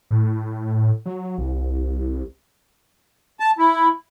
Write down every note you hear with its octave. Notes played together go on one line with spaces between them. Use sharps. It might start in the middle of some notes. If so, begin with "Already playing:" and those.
A2
F#3
C2
A5
E4